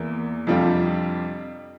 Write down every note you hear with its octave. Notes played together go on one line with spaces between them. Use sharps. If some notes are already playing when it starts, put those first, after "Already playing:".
Already playing: E2 E3 A#3 E4
F2 C3 G3 D4 F4